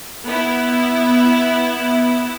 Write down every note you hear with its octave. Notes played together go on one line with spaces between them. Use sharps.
B3 E4